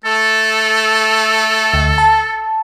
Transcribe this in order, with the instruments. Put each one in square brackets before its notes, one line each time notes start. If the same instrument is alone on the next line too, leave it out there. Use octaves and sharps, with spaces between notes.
[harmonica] A3 [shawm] A4
[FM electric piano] D2
A5